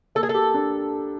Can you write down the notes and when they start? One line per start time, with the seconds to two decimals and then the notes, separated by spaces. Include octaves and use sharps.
0.15 A#3 A4
0.23 G#4
0.29 A4
0.34 G4
0.54 D4